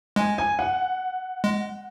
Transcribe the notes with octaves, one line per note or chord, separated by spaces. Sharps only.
G#3 G#5
G#5
F#5
G#3